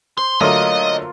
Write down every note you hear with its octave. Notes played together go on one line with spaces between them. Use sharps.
C5 C6
D3 F#3 A3 A#3 F4 D#5